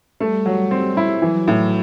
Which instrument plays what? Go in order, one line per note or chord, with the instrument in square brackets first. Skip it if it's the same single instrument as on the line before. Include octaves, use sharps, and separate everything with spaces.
[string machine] G3 [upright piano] A3
[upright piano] F#3
C4
E4
[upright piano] E3 [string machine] F#3
[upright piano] A2